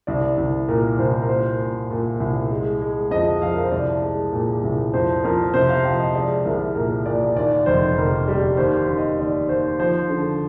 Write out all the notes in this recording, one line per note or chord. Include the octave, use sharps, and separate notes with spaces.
C2 D5
C2
A#2 A#4
C2 C5
A#4
A#2 C5
A#2
A#2
C2
G#3
G#3
F2 D#5
F2 F5
A#4
C5
C2 D5
G#3
A#2
C2
F2 C5
F2 A#4
C3 C5
F5
F3 G5
D#5
G#3 D5
C2 A#4
A#2 A#4
A#2 D5
D#2 D5
F1 C5
F1 A#4
G3
D#2 C5
D#2
D#5
D#2 D5
D#2 C5
F3 C5
D3